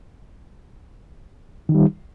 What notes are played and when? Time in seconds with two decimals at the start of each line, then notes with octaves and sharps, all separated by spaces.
1.69 D#3
1.72 D#4
1.75 G3